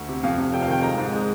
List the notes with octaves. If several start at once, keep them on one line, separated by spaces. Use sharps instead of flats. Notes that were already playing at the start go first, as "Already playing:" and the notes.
Already playing: D2
C3
F2 F5
C3
F1 G5
F5
D#3 G5
G#3 A#5
G#2
G#3